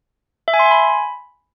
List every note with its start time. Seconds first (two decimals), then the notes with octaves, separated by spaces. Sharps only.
0.48 E5
0.54 G#5
0.59 C6
0.65 G#5
0.71 B5